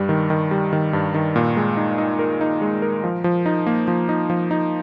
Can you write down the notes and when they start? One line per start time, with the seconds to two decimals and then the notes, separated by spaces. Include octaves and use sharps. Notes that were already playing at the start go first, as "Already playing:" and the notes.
Already playing: G2 G3
0.09 D#3
0.30 D#3
0.51 G3
0.73 D#3
0.93 G2
1.14 D#3
1.36 A#2
1.57 G#3
1.77 D#4
1.98 D#4
2.19 A#4
2.41 D#4
2.62 G#3
2.82 A#4
3.04 F3
3.24 F3
3.46 D#4
3.67 A#3
3.88 F3
4.09 D#4
4.30 F3
4.51 D#4